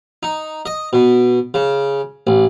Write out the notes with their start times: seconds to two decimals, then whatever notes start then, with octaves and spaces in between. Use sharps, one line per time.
0.23 D#4
0.66 D#5
0.93 B2
1.54 C#3
2.27 A1